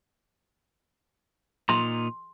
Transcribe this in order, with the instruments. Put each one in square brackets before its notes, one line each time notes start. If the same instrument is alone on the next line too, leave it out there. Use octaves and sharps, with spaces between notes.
[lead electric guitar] A#2 D#4 [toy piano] C6